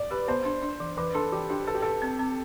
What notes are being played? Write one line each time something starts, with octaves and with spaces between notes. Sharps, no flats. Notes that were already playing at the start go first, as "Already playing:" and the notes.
Already playing: D5
G4 B4
B3 C5
D4
D4
E3
E3 B4
D4 A4
E3 G4
D4 G4
A4 B4
G4
A4 B4
C4
C4